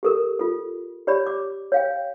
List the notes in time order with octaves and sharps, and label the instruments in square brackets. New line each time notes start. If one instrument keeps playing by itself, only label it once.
[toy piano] G4 A4 A#4
F4 A4
G4 C#5 D5 B5
D6
C#5 F5 G5